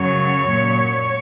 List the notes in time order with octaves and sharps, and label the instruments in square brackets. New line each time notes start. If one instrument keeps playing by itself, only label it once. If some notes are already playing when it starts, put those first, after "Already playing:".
Already playing: [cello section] F#2 C#3 F#3 C#5
A#2 F#3